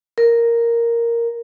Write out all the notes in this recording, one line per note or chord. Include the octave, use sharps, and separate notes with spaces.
A#4